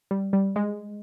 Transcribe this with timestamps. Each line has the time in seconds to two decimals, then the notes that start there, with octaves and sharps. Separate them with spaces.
0.11 G3
0.33 G3
0.56 G#3